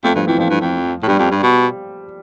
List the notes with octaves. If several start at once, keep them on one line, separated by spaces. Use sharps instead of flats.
F2 A3
G2 F3
F2 E3
F2 F3
G2
F2
A2
G2 G3
F2
G2
B2